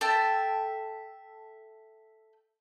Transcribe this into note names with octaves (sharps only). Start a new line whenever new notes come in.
A4 E5 G5 A5